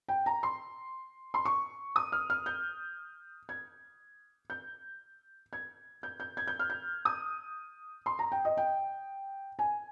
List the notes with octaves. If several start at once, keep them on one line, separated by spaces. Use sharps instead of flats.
G5
A#5
C6
C6
C#6
D#6
F6
F6
G6
G#6
G6
G#6
G6
G6
G#6
G6
F6
G6
D#6
C6
A#5
G5
D#5
G5
G#5